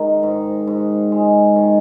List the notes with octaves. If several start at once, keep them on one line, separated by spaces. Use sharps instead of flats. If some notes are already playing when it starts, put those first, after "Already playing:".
Already playing: D#3 G#3
G#2
G#2
G#3
D#3